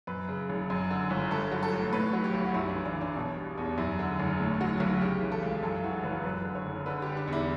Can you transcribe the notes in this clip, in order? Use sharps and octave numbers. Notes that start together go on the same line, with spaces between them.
F#2 B4
C#3
F#1
F#2
D3
G1
G2 A4
F#3
A4
A1
A2 B4
F#3
G4
B1
F#4
F#2 E4
D4
E4
E3
D4
F#1
D4
B2 D4
G3
E2
F#2 E4
D3
F#1
A2
F#3
B1
C#3 G4
E3
A4
C#2
F#2 A4
E3 F#4
F#1 B4
F#2 B4
D3
C#5
F#1
D3 B4
G3 G4
D4
E2
E4